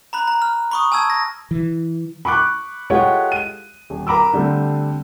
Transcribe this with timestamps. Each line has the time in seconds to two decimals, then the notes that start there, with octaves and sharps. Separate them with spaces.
0.13 A#5 B5 F#6
0.28 A#5
0.42 F6
0.71 B5 C#6 D#6
0.92 G#5 A5 E6 G#6
1.10 A#6
1.51 E3
2.25 B5 C#6 D6 F#6
2.90 G#3 F4 G4 A4 C#5 F#5
3.32 D#7
3.90 D#1
4.07 A#4 A#5 B5 D6 E6
4.33 D3 G3 A3 C4